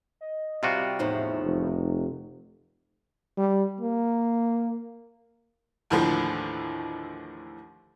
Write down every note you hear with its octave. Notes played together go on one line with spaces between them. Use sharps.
D#5
C3 G3 F4 F#4
E2 A2 F3 D#4
F1
G3
A#3
D#2 A2 D3 E3 F3